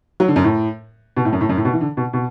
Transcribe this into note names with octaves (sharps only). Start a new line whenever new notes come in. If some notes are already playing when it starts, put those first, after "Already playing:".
F#3
D3
F#2
A2
B2
A2
F#2
A2
F#2
A2
B2
E3
D3
B2
B2